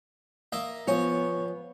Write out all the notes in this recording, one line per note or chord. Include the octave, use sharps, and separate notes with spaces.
A#3 D#5 E5
F3 B3 C#5 G#5